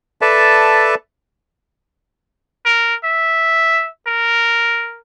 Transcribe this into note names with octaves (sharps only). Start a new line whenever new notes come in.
A4 B4 D5 E5 A5
A#4
E5
A#4